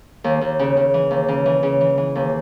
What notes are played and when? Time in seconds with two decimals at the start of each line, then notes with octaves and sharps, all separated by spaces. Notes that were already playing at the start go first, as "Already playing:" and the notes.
0.24 D#2
0.41 D#2
0.59 C#3
0.77 C#3
0.94 E3
1.11 D#2
1.28 C#3
1.46 E3
1.63 C#3
1.81 E3
1.98 E3
2.15 D#2